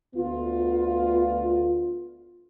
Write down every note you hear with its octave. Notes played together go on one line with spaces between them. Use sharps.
D2 B3 F4